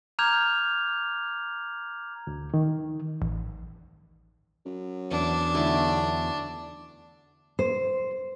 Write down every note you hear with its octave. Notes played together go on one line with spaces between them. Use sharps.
A#5 D6 F6 G6 G#6 F7
D2
D#3
A1
F#2
E2 D4
B1 D3 A3 E4
C5